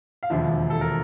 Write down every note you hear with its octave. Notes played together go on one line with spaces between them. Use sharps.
F5
E1 D#2 D3 F3 E5
A4
A#4